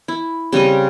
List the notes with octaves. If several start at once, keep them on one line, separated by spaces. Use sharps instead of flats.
E4
C#3 G3 C4 D#5